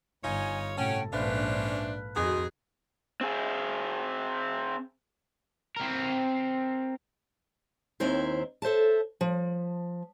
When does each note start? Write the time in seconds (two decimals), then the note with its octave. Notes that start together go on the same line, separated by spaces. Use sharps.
0.23 G1 D#4 F4 C#5 G#5
0.77 A2 C3 C#4 A4 F#5 G5
1.12 A#1 G#2 C#4 D4 B4 C5 E5 F5
2.16 F2 D#3 F#4 G#4 D#5 C6
3.21 C4 G#4
5.76 C4 A#4
8.00 D#2 D#3 C4 E4 C5 E5
8.62 A4 C5 E5 A5
9.21 F3